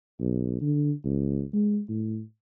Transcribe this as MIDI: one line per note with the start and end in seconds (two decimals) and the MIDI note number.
0.20 0.58 35
0.61 0.92 50
1.04 1.43 37
1.53 1.80 56
1.89 2.21 45